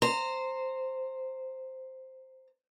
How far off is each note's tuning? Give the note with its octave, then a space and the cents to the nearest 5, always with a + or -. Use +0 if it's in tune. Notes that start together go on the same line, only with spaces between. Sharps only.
C5 +0 A#5 -20